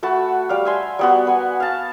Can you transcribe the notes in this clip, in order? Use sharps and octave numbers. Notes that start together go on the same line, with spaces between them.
A3 F#4 A5 B5
G3 F5
E5 G#5 C6
G3 B3 F#4
B4 G#5
F5 A5